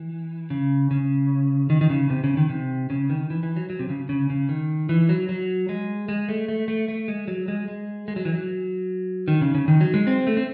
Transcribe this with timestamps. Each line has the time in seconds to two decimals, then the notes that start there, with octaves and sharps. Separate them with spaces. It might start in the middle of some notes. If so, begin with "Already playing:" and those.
Already playing: E3
0.50 C#3
0.91 C#3
1.70 D#3
1.81 D#3
1.90 C#3
2.10 C3
2.24 C#3
2.37 D#3
2.49 C3
2.90 C#3
3.10 D#3
3.30 E3
3.43 E3
3.56 F#3
3.70 F#3
3.79 C3
3.89 C#3
4.09 C#3
4.30 C#3
4.49 D#3
4.89 E3
5.09 F#3
5.29 F#3
5.69 G#3
6.09 G#3
6.29 A3
6.48 A3
6.68 A3
6.88 A3
7.08 G#3
7.28 F#3
7.48 G#3
7.68 G#3
8.08 G#3
8.16 F#3
8.25 E3
8.34 F#3
9.28 D#3
9.41 C#3
9.55 C#3
9.68 D#3
9.81 F#3
9.94 G#3
10.07 C4
10.27 A3
10.37 C4